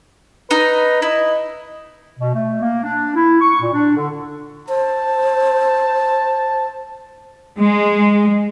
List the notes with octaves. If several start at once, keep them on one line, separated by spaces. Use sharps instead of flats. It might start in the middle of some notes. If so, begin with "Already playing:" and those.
D#4 B4
E4 D#5
B2
A3
A#3
D4
E4
C#6
A#2
D4
D3
C5 A5
G#3